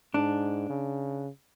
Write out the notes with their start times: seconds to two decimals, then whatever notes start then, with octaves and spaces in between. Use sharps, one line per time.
0.14 G#2 D4
0.69 C#3